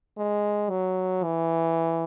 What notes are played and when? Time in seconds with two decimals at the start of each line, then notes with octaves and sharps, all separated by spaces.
0.17 G#3
0.70 F#3
1.24 E3